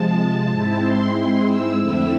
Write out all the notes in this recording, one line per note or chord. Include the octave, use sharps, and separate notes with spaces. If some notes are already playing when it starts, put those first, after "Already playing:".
Already playing: C3 F3 G#3 A5
G#2 G#3 C4 E4
C6
C6
E6
F2 D3 A3 C4 E4 E6